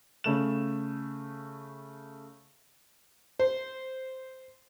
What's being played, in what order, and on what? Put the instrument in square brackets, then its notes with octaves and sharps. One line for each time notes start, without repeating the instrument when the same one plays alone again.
[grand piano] C#3 A3 E7
[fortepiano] C5